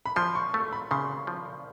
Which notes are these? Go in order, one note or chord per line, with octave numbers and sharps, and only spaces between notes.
B5
F3 C6
C#6
A3 C#6
B5
C#3 C6
F3